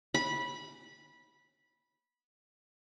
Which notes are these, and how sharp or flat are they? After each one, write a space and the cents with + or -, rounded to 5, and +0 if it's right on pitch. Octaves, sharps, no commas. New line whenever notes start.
B5 -15